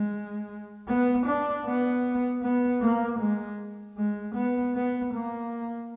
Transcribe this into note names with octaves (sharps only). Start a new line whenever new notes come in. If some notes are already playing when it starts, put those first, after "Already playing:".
Already playing: G#3
B3
D4
B3
B3
A#3
G#3
G#3
B3
B3
A#3